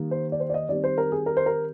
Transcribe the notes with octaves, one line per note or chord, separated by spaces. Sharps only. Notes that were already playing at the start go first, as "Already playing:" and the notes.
Already playing: D#3 G3 A#3
C5
D5
C5
D5
D#5
D#3 G3 C4 D5
C5
A#4
G#4
A#4
C5
A#4